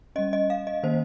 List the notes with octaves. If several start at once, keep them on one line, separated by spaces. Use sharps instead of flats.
G3 C#4 D#5
D#5
F5
D#5
D#3 A#3 C#4 C5